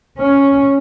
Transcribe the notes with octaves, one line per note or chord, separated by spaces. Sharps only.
C#4